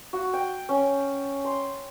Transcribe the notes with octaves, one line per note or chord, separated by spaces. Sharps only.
F#4
G5
C#4
C6